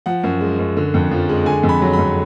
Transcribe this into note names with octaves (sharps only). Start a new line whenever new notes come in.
F3 F#5
F#2
G#3
F#2
D3
F2
F3
G#3
D3 G#5
F2
B5
F#3
B5
F2